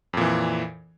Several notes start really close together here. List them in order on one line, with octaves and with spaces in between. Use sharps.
F2 A#2 E3